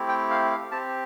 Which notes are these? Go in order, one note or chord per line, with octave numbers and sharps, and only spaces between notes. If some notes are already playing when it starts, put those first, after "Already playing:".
Already playing: A3 C4 E4 G4
G5
F5
F5
C4 G4 A5